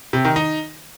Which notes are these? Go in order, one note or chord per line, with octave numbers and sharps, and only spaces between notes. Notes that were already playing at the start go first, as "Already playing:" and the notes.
C3
D#3
D#4